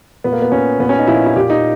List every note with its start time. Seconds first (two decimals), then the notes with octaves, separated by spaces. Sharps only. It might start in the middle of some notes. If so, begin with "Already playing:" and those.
0.24 A#2 B3
0.33 A#3
0.42 B3
0.52 A#2 C#4
0.80 A#2 B3
0.89 C#4
0.99 D#4
1.07 A#2 E4
1.26 E4
1.36 A#2 G4
1.50 D#4